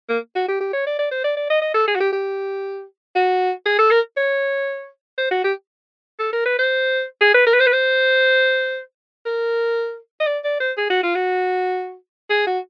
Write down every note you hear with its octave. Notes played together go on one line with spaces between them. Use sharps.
A#3
F#4
G4
G4
C#5
D5
D5
C5
D5
D5
D#5
D#5
A4
G#4
F#4
G4
G4
F#4
G#4
A4
A#4
C#5
C5
F#4
G4
A4
A#4
B4
C5
G#4
B4
A#4
B4
C5
B4
C5
A#4
D#5
D5
D5
C5
G#4
F#4
F4
F#4
G#4
F#4